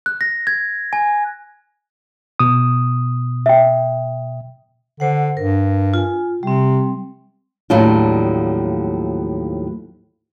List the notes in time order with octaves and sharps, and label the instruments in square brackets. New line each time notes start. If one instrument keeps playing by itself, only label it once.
[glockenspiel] F#6
A#6
G#6
G#5
[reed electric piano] B2 D#6
[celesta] E5 G5
[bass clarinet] D3 [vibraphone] C5 F#5
[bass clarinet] G2 [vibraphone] A#4
[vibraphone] F4 G#5
[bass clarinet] C3 [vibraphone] G3 C4
[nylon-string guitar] D#2 A2 F3 F#3 D4 F4